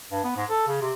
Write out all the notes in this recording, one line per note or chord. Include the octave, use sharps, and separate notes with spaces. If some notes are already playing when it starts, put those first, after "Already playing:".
G2
B3
G#2
A4
C#3
C3